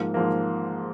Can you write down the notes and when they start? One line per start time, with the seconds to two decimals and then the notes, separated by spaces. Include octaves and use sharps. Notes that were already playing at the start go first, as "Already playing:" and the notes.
Already playing: G#2 F3 A#3
0.14 G#2 F3 A#3